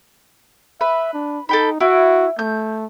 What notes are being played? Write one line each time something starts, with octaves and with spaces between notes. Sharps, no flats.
B4 E5
D4
D#4 A4 G5 B5
E4 F#4
A3 G6